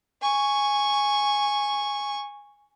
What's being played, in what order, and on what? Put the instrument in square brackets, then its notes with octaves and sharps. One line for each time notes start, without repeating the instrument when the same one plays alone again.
[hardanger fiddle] G#5 C#6